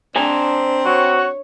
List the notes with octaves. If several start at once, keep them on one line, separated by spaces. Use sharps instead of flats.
C4 D4 C5 G#5 A#5
F#4 C#5